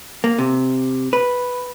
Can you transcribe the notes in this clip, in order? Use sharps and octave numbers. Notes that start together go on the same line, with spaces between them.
A#3
C3
B4